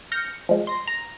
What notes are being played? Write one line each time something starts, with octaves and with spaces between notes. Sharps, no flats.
F6 G6 A#6 C#7
F3 G#3
C6 A#6
A#5